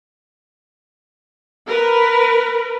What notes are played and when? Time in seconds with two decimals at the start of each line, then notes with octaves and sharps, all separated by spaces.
1.67 A#4 B4